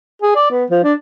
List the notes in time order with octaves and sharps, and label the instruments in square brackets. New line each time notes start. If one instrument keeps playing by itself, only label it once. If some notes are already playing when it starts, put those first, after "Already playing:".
[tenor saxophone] G#4
D5
B3
F3
D4